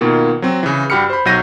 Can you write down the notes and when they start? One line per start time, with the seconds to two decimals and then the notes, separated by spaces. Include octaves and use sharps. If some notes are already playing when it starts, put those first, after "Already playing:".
0.01 B2 D#3 A#3 F4
0.42 F#3 C4
0.63 C#3 E3
0.90 G2 F#4 G4 B5 F6 C#7
1.10 C5 B5
1.25 B1 F#3 F#4 G6 A#6 D#7